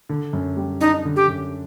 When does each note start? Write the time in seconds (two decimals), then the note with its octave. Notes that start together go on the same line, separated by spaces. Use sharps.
0.09 D3
0.33 F#2
0.57 G3
0.81 D4 D#4
1.05 D3
1.16 G4
1.28 F#2